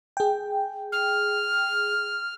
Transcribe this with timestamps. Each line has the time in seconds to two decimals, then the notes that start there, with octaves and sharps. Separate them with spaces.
0.17 G#4 G5
0.92 F6